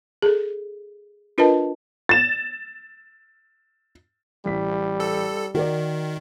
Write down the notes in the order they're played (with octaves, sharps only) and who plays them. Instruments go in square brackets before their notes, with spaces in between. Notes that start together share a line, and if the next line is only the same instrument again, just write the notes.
[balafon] G#4 A4
D4 F4 A#4 B4 D#5 A5
[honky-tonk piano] A6 E7
[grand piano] A1 B6 [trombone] G3
[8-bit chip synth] A4
[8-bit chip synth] D#3 [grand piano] F#4 A#4 D5